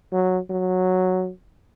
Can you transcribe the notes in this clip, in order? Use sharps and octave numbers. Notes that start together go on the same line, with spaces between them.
F#3
F#3